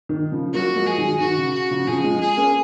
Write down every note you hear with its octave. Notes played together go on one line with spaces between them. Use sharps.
D#3
C#3 F3
F#3 A#3 F#4
F3 G#3
G#4
D#3 F#3
D#3 F#4
C#3
F#4
C#3 F3
C#3 F3 G#4
F3 G#3
G#4
A#3 C#4